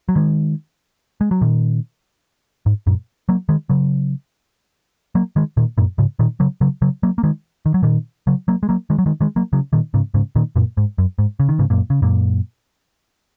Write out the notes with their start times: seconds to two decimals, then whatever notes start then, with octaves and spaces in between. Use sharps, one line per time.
0.09 F#3
0.16 D#3 G#3
1.21 G#3
1.31 F#3
1.41 A#2 D#3
2.66 G#2
2.87 F#2 A#2
3.29 F#3 A#3
3.49 D#3 G#3
3.69 C#3 F#3
5.15 F#3 A#3
5.36 D#3 G#3
5.57 A#2 D#3
5.78 F#2 A#2
5.98 G#2 C#3
6.19 A#2 D#3
6.40 C#3 F#3
6.61 C#3 F#3
6.82 C#3 F#3
7.03 F#3 A#3
7.18 A#3
7.23 D#3 G#3
7.66 D#3
7.74 F#3
7.83 A#2 D#3
8.27 C#3 F#3
8.48 F#3 A#3
8.63 G#3
8.69 F#3 A#3
8.90 D#3 G#3
8.99 F#3
9.06 D#3 G#3
9.21 D#3 G#3
9.36 F#3 A#3
9.53 C#3 F#3
9.73 A#2 D#3
9.94 G#2 C#3
10.14 G#2 C#3
10.36 A#2 D#3
10.56 F#2 A#2
10.77 G#2
10.98 F#2
11.19 G#2
11.40 C#3
11.49 D#3
11.59 G#2 C#3
11.70 F#2 A#2
11.90 C#3
12.02 F#2 A#2